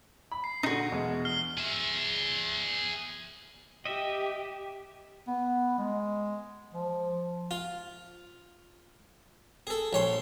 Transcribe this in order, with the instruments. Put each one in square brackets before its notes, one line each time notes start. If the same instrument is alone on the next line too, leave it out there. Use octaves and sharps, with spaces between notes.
[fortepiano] B5
[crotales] C7
[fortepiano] A#2 D3 [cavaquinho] D#4 F#4
[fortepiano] E2 B2 G#3
[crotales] F6 C7 G7
[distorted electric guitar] G#4 E5
[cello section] G4 [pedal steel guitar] D#5 E5
[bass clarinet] B3
G#3
F3
[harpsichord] F4
G#4 A4
A#1 C#5 C6